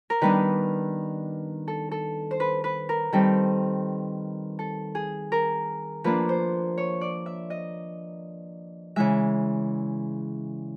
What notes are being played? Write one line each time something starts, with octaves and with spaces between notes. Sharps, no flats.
A#4
D#3 G3 B3 D4 B4
A4
A4
C5
B4
B4
A#4
D#3 G3 C4 A4
A4
G#4
A#4
F3 A#3 D4 B4
C5
C#5
D5
E5
D#5
C#3 E3 G#3 E5